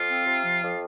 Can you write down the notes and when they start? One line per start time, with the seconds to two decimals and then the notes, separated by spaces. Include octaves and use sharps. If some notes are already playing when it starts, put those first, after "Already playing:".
Already playing: F2 F4
0.09 C4
0.27 C3
0.45 F3
0.62 F2